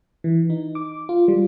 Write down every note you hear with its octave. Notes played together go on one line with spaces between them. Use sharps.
E3
D#4
D6
F4
G3